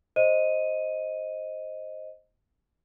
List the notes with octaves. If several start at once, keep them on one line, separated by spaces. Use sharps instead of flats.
C5 D#5 D#7